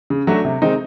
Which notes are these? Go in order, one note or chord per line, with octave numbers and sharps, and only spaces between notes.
C#3
F#3 A3 D4 F#4
C3
D#3 G#3 C4 D#4